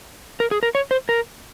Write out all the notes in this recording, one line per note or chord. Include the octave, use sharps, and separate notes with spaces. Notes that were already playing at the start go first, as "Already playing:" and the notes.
A#4
G#4
A#4
C#5
C5
A#4